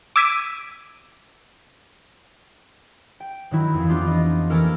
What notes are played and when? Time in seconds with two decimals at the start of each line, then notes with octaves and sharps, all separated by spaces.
0.16 D6 E6 G#6 B6 D7 D#7
3.20 G5
3.51 D#3 F#3 E4
3.74 F2 E3
3.89 B3 D4 F4 G4
4.05 F4 D#5
4.50 E3 A#3 C#4 A4 A#4